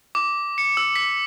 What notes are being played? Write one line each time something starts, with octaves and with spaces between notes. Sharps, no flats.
D6
C#7
E6
B6